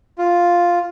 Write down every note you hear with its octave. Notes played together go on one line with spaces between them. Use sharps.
F4